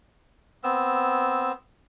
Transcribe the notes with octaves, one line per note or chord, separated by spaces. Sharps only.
B3 C4 E6